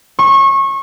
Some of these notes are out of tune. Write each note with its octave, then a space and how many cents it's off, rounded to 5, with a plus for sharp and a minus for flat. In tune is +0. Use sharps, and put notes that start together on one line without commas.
C#6 -25